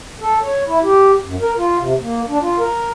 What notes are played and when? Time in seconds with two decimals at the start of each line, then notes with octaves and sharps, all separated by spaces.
0.21 A4
0.42 C#5
0.67 E4
0.83 G4
1.24 F#2
1.41 A#4
1.57 F4
1.78 C3
2.01 A#3
2.28 D4
2.41 F4
2.58 A#4